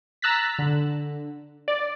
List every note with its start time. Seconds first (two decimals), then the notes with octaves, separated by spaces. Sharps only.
0.22 A#5 E6 F#6 A6 B6
0.59 D3
1.68 D5